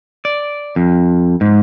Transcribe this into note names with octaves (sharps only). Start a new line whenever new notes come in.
D5
F2
G#2